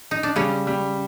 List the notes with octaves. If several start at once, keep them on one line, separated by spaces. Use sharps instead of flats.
D#4
D4
C#3 G3 C#4
G3